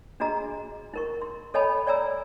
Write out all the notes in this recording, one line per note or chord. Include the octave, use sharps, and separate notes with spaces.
D4 F#4 G#4 D#5 A#5
D#4 A#4 C#6
C6
A4 C#5 D#5 G#5 A5 B5
C#5 D5 G#5 A#5 E6